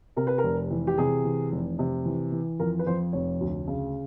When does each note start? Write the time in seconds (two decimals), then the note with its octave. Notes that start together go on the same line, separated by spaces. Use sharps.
0.17 C3 A#4
0.27 B4
0.38 A#4
0.44 F1
0.71 E3
0.87 G4
0.98 C3 G#4
1.25 E3
1.52 F1
1.79 C3
2.05 E3
2.32 E3
2.60 F2 A#4
2.79 B4
2.87 F2 C5
3.13 F1 C#5
3.40 D2
3.67 C#3